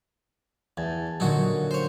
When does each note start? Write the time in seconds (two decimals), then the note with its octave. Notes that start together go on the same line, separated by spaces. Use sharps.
0.77 E2 G#5 A5
1.20 A#2 D3 F#3 D#4 F#4
1.71 C5 C#5